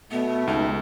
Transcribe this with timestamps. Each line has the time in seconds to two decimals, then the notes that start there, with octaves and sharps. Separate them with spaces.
0.11 B2 A3 B3
0.47 C#2 D#4